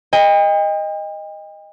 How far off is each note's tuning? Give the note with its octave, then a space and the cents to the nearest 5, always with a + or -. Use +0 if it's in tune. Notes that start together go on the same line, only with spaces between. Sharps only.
D#5 +0 G5 +40